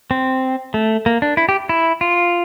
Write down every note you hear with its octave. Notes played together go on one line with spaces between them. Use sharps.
C4
A3
A#3
D4
E4
G4
E4
F4